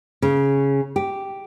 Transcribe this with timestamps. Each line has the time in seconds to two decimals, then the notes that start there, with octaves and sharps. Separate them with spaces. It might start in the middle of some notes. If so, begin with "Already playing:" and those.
0.22 C#3
0.96 G4